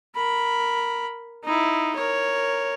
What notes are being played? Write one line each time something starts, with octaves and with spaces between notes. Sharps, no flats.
A#4 B5
D#4 E4
A#4 C#5